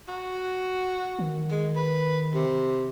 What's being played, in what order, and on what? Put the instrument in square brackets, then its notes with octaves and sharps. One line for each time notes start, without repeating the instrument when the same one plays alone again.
[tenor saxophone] F#4
[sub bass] D#3
[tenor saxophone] G#3
B4
C3